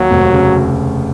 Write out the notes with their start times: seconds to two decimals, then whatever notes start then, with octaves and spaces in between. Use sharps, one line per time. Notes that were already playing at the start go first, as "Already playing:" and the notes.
Already playing: D#2 F#3
0.11 F1
0.33 C#3